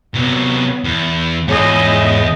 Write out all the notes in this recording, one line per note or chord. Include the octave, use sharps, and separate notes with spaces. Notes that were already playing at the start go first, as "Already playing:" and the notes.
C3 F#3 B3
E2
E2 G#2 G#4 C#5 D#5